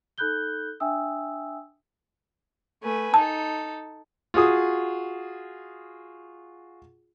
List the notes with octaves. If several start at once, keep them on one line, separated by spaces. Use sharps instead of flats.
D#4 A4 B5 F#6 G6 G7
D4 E5 G5 G#5 D#6 E6
A3 B4 G#5
D#4 A4 A5
F4 F#4 G#4 D#6